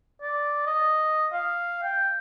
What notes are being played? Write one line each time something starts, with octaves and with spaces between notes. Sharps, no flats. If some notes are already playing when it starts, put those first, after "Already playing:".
D5
D#5
F5
G5